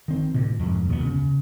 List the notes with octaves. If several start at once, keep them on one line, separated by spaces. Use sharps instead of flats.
D#3 C4
D2 A2 C3
F2 G#2
D#2 B2 G#3 B3
C#3